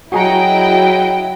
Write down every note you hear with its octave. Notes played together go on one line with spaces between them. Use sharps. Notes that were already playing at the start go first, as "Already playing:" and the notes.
F#3 E4 F#4 G#4 D#5 G5 A#5